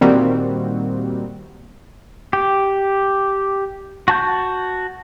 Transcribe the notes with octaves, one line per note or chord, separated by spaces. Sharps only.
A#2 D#3 G3 A#3 C4 F#4
G4
F#4 A5 G6